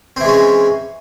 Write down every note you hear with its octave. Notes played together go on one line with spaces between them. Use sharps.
E3 G#3 C4 C#4